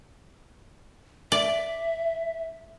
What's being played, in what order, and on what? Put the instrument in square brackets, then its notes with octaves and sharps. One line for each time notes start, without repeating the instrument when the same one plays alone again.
[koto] D5 [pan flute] E5